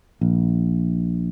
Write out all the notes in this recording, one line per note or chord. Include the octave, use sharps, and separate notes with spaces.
A#1